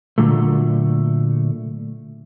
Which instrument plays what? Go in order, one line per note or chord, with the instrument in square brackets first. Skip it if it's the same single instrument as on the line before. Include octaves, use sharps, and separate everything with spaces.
[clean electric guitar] A#2 D3 F#3 A3